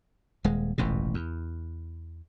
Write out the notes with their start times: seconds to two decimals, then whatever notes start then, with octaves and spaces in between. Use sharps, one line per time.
0.44 D#1 G#3
0.78 E1 A1 F2 C3
1.14 E2